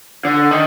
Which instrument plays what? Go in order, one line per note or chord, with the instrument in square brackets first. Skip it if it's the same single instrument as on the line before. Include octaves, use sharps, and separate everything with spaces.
[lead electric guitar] D3
D#3